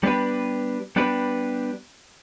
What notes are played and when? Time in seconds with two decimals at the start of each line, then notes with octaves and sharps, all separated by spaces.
0.03 G3 B3 D4 G4 B4
0.96 G3 B3 D4 G4 B4